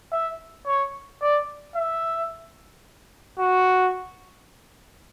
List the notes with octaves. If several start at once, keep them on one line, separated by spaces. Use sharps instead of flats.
E5
C#5
D5
E5
F#4